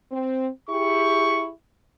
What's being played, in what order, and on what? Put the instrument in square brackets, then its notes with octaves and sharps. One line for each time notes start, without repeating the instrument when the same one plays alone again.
[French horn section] C4
[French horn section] E4 G4 G#4 [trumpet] C#6